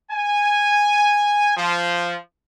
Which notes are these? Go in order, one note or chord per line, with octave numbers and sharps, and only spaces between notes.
G#5
F3